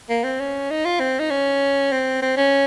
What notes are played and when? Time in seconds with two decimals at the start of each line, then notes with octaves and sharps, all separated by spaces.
0.09 A#3
0.24 C4
0.40 C#4
0.70 D#4
0.85 F4
1.00 C4
1.19 D#4
1.30 C#4
1.92 C4
2.22 C4
2.37 C#4